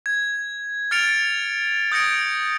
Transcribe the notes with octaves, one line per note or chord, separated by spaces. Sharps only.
G#6
F6 G#6 A6 C#7 D7 F7
D#6 G6 G#6 A#6 C#7 D7